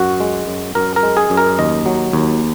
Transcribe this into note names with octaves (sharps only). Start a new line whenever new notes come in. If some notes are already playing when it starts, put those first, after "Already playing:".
Already playing: F#2 F#4
G#3
F#2
F#2 A#4
A#4
G#3
G#4
F#2
A#4
D#2 D#5
F#3
D#2